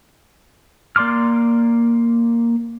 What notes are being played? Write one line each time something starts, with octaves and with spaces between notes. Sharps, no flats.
A#3 D5 C6 D6 F6